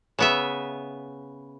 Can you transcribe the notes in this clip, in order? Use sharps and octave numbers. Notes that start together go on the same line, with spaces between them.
C#3 B3 E5